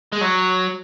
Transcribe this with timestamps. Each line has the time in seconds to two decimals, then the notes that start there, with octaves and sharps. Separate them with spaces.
0.12 G#3
0.21 F#3